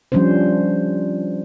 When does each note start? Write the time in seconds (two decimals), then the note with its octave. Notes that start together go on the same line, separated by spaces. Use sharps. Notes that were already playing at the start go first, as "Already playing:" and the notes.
0.12 F3 G3 C#4 D4 C5